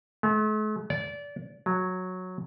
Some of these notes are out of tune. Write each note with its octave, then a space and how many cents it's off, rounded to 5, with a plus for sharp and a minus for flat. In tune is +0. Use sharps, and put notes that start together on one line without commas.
A3 -45
D5 -25
F#3 -10